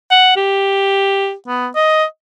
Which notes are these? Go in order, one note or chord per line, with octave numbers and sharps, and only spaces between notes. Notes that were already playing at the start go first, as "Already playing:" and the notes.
F#5
G4
B3
D#5